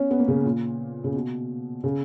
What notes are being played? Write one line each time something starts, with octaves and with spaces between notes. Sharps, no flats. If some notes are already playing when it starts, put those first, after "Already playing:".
Already playing: B3 C#4
B3
A#3
C#3
A#2
C#3
B2
C#3